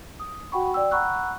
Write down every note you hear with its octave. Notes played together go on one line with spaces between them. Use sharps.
D#6
F#4 F#5 G5 B5 C#6
D5 G5 E6
F#5 A#5 B5 C#6 E6 F#6